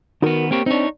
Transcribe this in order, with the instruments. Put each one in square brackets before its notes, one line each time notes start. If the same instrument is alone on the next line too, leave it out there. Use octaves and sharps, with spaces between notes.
[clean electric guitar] D#3 B3 [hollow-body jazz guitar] D#4 F#4 A#4
[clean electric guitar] A#3 G4 C#5 [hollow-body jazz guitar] C4
[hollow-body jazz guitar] C4 D4 [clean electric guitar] D#4 C#5